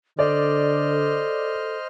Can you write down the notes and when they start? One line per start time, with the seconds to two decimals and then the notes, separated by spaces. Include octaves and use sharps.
0.19 D3 A4 C5 D5 D#5 F6